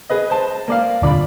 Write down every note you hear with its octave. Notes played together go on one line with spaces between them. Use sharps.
G#4 B4 D#5
C5 A5
A#3 D5 F5
D#1 D3 F4 D5 B5